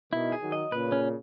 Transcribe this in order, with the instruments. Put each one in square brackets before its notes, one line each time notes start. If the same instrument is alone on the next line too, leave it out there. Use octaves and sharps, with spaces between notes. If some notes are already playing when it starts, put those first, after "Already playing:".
[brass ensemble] B2 D#3 [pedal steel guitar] E4
[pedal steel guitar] G#4
[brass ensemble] D#3 F#3
[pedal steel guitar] D#5
[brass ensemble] A#2 C#3 [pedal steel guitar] B4
[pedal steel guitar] C#4